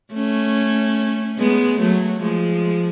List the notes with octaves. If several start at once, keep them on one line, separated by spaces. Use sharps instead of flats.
A3 C#4
G#3 B3
F#3 A3
F3 G#3